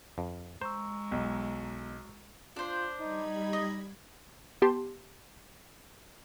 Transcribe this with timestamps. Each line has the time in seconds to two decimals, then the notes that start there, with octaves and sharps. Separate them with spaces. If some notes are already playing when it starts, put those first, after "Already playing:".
0.18 F2
0.62 G#3 C5 A#5 C#6 E6
1.11 B1
2.56 D4 F4 C5
3.01 G3 D#4 B5 G#6
3.53 D#5
4.62 B3 G4 A5 C6